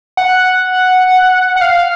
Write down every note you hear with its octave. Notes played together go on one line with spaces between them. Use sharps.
F#5
F#5
F5